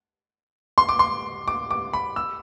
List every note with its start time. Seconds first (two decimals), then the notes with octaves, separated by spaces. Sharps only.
0.78 C6
0.89 D6
0.99 C6
1.48 D6
1.71 D6
1.93 B5
2.16 E6